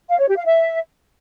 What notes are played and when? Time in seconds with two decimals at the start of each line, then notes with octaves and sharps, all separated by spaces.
0.10 F5
0.19 C#5
0.28 G4
0.37 F5
0.46 E5